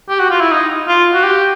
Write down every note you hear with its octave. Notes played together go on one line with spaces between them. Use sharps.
G4
F#4
F4
E4
D#4
F4
F#4
G4